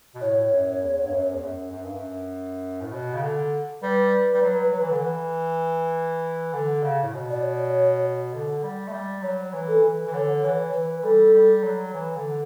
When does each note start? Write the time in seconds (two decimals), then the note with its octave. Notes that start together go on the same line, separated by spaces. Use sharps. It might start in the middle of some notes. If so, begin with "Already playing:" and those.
0.15 B2
0.21 A2 C#5
0.52 F#2
0.82 E2
1.02 G2
1.12 F#2
1.33 E2
1.42 F#2
1.71 F#2
1.84 G2
1.96 F#2
2.81 A2
2.92 B2
3.14 C#3
3.22 D3
3.82 G3 B4
4.34 G3
4.42 F#3
4.72 F#3
4.81 E3
4.90 D3
4.98 E3
6.53 D3
6.83 C#3
7.03 A2
7.13 B2
7.30 D5
7.43 C#5
8.33 D3
8.63 G3
8.88 A3
8.93 G3
9.23 F#3 C#5
9.53 E3
9.68 A4
9.83 E3
10.06 E3
10.13 D3 C#5
10.43 E3 C#5
10.73 E3 B4
11.04 G3 A4
11.34 G3
11.63 F#3
11.94 E3
12.16 D3